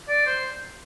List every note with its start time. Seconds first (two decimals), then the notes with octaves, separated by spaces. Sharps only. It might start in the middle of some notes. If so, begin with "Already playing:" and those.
0.08 D5
0.26 C5